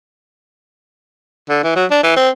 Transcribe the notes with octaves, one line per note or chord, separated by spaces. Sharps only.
D3
E3
F#3
D4
E3
C4